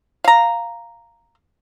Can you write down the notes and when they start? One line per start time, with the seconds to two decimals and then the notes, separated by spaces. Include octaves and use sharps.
0.24 F5 A#5